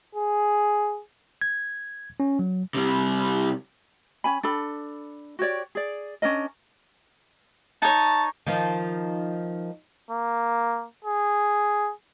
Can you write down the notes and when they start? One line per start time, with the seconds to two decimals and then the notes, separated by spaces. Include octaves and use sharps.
0.15 G#4
1.41 G#6
2.20 C#4
2.39 F#3
2.75 C3 G3
4.24 C#4 G#5 B5
4.43 D4 A4 B5
5.39 F#4 G4 C#5 D5
5.75 G#4 D5
6.22 C#4 D4 A#4 D#5
7.82 D#4 C#5 A5
8.47 D#3 F3
10.11 A#3
11.05 G#4